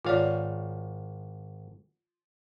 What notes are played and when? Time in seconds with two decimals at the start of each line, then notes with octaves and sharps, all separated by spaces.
0.05 G#1 F4 C#5 D5 F5